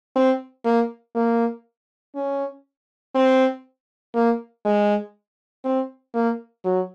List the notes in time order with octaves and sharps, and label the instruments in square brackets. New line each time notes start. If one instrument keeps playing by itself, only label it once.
[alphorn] C4
A#3
A#3
C#4
C4
A#3
G#3
C4
A#3
F#3